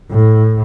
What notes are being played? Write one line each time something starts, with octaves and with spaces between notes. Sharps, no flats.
A2